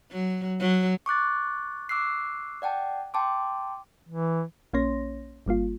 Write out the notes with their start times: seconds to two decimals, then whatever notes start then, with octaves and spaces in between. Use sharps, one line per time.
0.11 F#3
0.60 F#3
1.06 C#6 D6 F#6 A6
1.89 C#6 D6 E6 F#6 C7
2.62 D5 F#5 G5 A5
3.14 G5 A5 C6 D6
4.09 E3
4.73 A#1 A#3 C#4 C#5 C6 A#6
5.46 G1 G3 A#3 F4